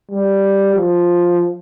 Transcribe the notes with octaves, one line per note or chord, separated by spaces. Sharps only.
G3
F3